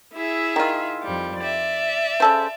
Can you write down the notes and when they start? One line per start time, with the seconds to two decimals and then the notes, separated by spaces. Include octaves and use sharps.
0.14 E4 G#4 E5
0.56 D#3 F4
1.01 F2 G3
1.38 D5 E5
2.20 C#3 A4 C5